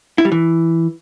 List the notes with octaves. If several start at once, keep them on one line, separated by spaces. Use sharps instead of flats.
E4
G3
E3